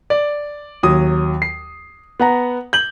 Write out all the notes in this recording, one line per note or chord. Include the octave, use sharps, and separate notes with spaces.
D5
D#2 F#3 D#6
C7
B3 F#5 A#5
G6 F#7